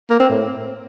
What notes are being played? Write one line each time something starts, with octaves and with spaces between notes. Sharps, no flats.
A#3
C4
A2